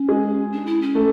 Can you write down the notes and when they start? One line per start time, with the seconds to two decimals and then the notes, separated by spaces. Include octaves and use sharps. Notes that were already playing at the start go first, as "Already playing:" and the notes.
Already playing: C#4
0.08 G#3 G#4
0.52 D4
0.66 E4
0.81 C#4
0.95 A3 A4